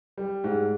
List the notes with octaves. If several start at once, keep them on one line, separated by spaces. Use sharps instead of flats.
G3
G#2